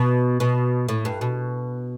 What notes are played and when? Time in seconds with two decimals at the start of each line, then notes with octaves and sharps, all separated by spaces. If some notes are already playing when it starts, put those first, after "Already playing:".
Already playing: B2
0.40 B2
0.89 A2
1.05 G2
1.21 B2